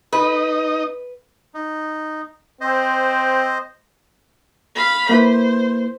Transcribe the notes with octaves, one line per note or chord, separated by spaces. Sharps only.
D#4 B4 D#5
D#4
C4 C5 D#5
F5 B5
A#3 E4 B4 C5